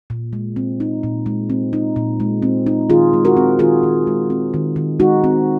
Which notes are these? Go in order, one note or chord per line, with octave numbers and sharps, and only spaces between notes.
A#2
G#3
C4
D#4
A#2
G#3
C4
D#4
A#2
G#3
C4
D#4
D#3 F4 G#4
G#3
F#4 A#4
C4
D#3 F4 G#4
D#3
G#3
C4
D#3
D#3
G#3 D#4 F#4
C4